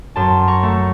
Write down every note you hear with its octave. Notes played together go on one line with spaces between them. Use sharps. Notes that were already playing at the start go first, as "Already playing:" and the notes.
F#2 A5 C6
A#5 C#6
A3